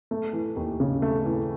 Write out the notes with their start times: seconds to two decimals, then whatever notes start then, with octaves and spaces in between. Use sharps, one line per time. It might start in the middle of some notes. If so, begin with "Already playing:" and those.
0.11 A3
0.33 E3
0.56 D#2
0.80 C#3
1.02 A3
1.25 E3